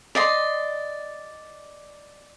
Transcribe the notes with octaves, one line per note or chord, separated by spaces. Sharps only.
D5 D#5 C6